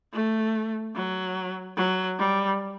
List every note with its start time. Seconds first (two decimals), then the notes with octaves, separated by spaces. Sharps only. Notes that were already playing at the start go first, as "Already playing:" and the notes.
0.13 A3
0.95 F#3
1.77 F#3
2.19 G3